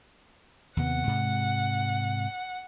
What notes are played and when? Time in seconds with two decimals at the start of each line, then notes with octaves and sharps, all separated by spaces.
0.77 D#2 C3 B3 F#5
1.07 G#2 C3